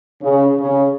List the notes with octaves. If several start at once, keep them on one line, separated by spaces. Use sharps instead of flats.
C#3
C#3